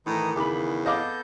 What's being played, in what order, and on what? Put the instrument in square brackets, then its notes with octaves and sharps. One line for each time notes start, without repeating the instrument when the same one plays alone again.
[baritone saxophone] A2 [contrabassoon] D#3 [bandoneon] E3 D#4 D#6
[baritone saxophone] E2 [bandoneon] C#3 [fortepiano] B5 D6
[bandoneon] B3 A4 G6 [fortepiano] D#5 F5 D6